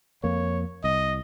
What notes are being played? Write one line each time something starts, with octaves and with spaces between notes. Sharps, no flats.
F2 A#3 C#5
C2 D#5